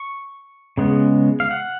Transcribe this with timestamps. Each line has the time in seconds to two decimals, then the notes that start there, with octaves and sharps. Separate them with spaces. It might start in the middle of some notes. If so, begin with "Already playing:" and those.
Already playing: C#6
0.78 C#3 G#3 B3
1.40 F5
1.51 F#5